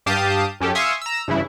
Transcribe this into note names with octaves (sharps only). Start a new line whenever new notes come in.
G2 G4 F5 A5 D#6 G6
F#2 C#4 G4 A4
E5 F5 G#5 C6 C#6 D#6
A#5 E6
G2 C#3 E3 E4